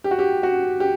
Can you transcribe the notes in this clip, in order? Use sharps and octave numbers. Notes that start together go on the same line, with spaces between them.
G4
F#4
G4
F#4
G4